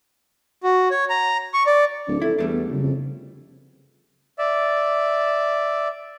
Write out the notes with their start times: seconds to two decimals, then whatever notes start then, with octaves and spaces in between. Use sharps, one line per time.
0.63 F#4
0.91 C#5
1.10 A#5
1.54 C#6
1.67 D5
2.08 D1 D4
2.22 F2 E4 A4
2.38 E2 G3 A3 D4
2.52 B3
2.71 F#2 C#3
2.83 F2
4.38 D5 E5